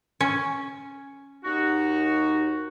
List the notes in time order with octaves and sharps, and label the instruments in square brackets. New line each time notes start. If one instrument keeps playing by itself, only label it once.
[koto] C#4
[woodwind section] D#2 D#4 F#4